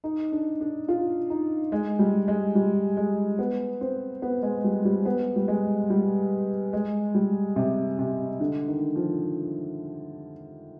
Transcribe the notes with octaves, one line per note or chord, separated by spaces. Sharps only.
D#4
D4
D4
F4
D#4
G#3
G3
G#3
G3
G#3
B3
C4
B3
G#3
G3
G3
B3
G3
G#3
G3
G#3
G3
C3
C3
D3
D#3
F3